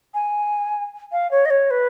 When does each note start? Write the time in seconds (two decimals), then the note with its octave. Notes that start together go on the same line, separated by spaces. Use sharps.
0.14 G#5
1.12 F5
1.31 C#5
1.45 D#5
1.50 C#5
1.71 B4